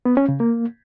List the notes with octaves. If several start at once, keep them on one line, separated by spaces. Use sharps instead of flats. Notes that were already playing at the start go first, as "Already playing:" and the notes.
B3
C#4
C#3
A#3